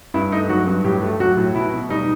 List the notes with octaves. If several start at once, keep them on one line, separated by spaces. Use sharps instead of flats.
G2 E4
A3 D#4
F#3 F#4
G2
A2 G4
A3
F#3 F#4
A2
B2 E4
B2
G3 D#4